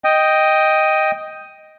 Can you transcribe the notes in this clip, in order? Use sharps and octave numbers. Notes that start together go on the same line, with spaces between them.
D#5 G5